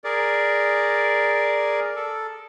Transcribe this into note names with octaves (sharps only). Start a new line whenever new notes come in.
G#4 A#4 D5
A4